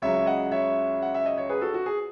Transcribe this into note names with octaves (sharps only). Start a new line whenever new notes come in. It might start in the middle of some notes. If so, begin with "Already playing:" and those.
C#2 C#3 F#3 C#5 E5
D#5 F#5
C#5 E5
F#5
E5
D#5
C#5
G#4 B4
F#4 A4
F#4
G#4